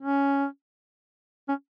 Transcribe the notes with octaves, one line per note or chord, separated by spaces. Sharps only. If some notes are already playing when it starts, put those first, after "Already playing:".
C#4
C#4